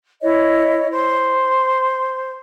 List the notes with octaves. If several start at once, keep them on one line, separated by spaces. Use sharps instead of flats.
E4 C#5 D#5
C5